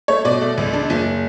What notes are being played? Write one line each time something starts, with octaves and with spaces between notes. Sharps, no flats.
A3 C#5
B2 D5
A3
C#2
D4
F#1